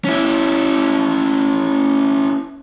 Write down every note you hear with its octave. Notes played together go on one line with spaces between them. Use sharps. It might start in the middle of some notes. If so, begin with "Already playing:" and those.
C#4 E4